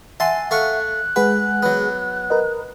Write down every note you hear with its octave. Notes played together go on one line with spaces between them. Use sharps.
E5 F#5 G#5 A5 C6
A3 F5 C#6 F#6
G#3 G#4 B4 F#5
F#3 B3
A#4 B4 D#5